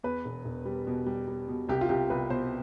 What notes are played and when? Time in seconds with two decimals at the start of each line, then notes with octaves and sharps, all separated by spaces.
0.03 E2 B4
0.25 E1
0.45 E1
0.66 G3
0.87 B2
1.06 G3
1.28 G3
1.48 B2
1.69 C2 G4
1.81 F4
1.89 C2 G4
2.10 C2 B4
2.30 B2 C5